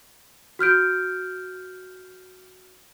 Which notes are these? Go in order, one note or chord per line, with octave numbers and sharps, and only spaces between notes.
F#4 F6 G6 D7